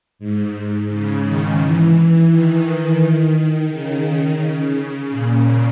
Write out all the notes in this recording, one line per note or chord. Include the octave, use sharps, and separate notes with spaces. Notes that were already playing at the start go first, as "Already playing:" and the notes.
G#2
G#2
C#3
D#3
E3
D#3
C#3
C#3
C#3
A#2